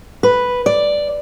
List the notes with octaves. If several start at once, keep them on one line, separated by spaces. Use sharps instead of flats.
B4
D5